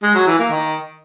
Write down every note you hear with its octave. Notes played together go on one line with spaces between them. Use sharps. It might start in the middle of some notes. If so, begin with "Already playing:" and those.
G#3
F#3
E3
A#3
D#3